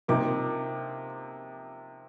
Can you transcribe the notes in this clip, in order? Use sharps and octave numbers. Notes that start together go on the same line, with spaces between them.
C3 F3 A#3 D#4 D6